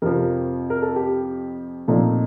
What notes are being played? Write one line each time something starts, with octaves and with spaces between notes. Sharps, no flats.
F2 C3 F3 A#4
A#4
A4
G4
A#2 F3 A3 C4 D#4